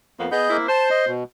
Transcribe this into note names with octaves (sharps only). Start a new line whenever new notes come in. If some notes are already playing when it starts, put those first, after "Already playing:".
F2 A#3 B3
B3 G#4 D#5 G6
A#3 C4 E4
C5 A5
D#5
B2